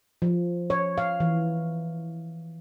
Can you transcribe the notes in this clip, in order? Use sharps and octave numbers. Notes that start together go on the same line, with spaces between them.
F3
C#5
F5
E3